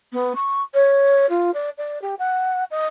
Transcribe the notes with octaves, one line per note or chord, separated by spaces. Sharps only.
B3
C#6
C#5
F4
D5
D5
G4
F#5
D#5